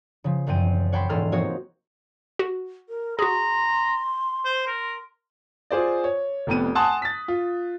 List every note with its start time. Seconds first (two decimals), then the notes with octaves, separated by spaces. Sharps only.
0.24 C#3 F3
0.46 E1 F#2 C4 G5 D#7
0.92 C#5 F#5 G5 A5 B5 C6
1.09 E1 G#2 G#4 A4 C6 F6
1.32 F3 A#3 C4 D#4 F#4 C#5
2.39 F#4
2.89 A#4
3.19 F#4 G#4 A#5 C6
4.45 C5
4.67 A#4
5.71 F4 G#4 C5 D5
6.04 C#5
6.47 F1 F2 B3 D#7
6.75 F#5 G#5 A5 C6 D#6 F#6
7.02 A6 B6
7.28 F4